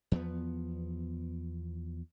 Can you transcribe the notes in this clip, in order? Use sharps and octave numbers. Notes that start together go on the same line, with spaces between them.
E2 F3 B3